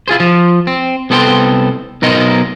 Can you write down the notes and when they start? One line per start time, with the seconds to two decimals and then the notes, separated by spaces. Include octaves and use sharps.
0.08 E4 F4 G#4 C5
0.20 F3
0.67 C4
1.10 C2 B3 A4 C5 G5 C6
2.02 B1 B2 D#4 A#4 C5 D#5